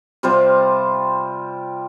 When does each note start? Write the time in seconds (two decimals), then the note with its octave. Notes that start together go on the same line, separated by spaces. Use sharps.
0.23 C3 G3 F4 C5